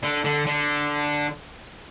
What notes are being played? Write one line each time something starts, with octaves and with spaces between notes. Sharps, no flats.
D3
D3
D3